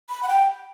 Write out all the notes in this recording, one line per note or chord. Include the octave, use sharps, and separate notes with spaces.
B5
F#5
G5